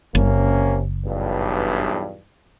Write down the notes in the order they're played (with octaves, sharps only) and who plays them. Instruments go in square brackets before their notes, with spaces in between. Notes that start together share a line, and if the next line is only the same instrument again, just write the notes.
[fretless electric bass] F#1 [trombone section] C3 A#3 C#4
[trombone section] B1 E2 G2